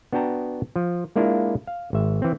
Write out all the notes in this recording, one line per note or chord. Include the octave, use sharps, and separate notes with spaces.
B3 D4 F#4 G5 A5 A#5
F3
G#3 A#3 D4 E4 F4
F5
G#1 E5
E3 C4